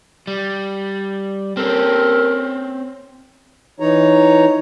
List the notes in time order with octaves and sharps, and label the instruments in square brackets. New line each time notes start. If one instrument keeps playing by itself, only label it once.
[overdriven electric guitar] G3
[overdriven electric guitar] C4 C#4 [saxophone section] G4 A4 A#4
[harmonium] E3 D#4 C#5 A#5